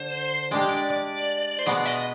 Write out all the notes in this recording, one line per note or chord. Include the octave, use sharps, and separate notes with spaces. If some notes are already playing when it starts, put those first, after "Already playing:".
Already playing: D3 C5
G#3 D4 G4 D5
D5
D5
C5
B2 G#3 B3 D5
D#5